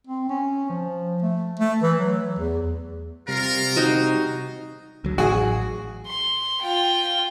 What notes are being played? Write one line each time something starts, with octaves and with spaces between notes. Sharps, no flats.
C4
C#4
F3
A3
A3
E3
F#3
E2
C3 G3 F4 A#4
D#4 F#4 D#5
D2 F#3
A1 A2 F#3 F#4 G#4
C6
F4 G5